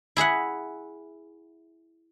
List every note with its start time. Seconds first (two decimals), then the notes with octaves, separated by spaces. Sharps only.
0.17 E4 G#4 E5 F#5